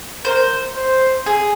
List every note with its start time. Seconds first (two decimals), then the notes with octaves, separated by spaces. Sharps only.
0.25 A#4 C5
0.76 C5
1.26 G#4